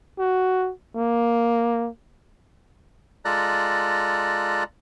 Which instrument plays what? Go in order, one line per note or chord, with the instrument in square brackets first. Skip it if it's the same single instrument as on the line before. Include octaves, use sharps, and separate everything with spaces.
[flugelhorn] F#4
A#3
[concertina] G#3 F4 A4 D5 A#5 F#6